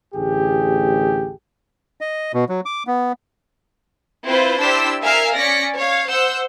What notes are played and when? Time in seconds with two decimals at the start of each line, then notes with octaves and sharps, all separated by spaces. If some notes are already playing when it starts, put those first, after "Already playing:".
0.14 A1 D2 G4 G#4
2.01 D#5
2.34 B2
2.49 F#3
2.65 D6
2.87 B3
4.26 C4 E4 F4 B4 C5
4.59 D4 E4 G4 C5 E6 B6
5.04 A#4 E5 F5 G#5 F6 C7
5.36 C#4 D5 A#6 B6 C#7
5.76 C#5 F5
6.10 C5 F#5 E6 G6